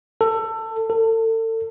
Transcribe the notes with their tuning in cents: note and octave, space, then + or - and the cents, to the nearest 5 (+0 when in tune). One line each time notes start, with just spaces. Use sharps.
A4 +20
A4 +35